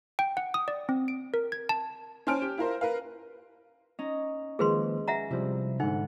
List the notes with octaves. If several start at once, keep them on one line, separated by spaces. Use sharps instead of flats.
G5
F#5
D#6
D5
C4
D7
A#4
G#6
A5
C#4 C5 G#5 A5 F6 D7
G4
E4 F4 A#4 C5
A#4 B4 F5
C#4 D#4 A#5
D#3 F3 G#3 A#3 G#4 B4 C6
E5 F#5 G#5 A#5
C3 F3 G3 E4
G#2 D3 D#4 F#5